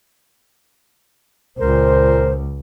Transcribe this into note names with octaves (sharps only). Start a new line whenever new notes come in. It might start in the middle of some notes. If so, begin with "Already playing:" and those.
C#2 A#2 A#4 C5